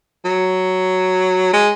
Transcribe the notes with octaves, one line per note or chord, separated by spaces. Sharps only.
F#3
G#3